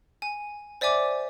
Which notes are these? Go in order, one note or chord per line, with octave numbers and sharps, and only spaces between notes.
G#5
C5 D5 E5 G#5 D6